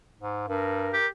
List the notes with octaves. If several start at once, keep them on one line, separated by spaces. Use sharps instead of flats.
G#2
G2 A#4
G4